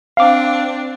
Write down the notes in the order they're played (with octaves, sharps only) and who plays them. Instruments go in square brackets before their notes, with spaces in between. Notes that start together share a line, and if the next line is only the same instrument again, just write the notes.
[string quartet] C4 D4 [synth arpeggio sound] F5 D6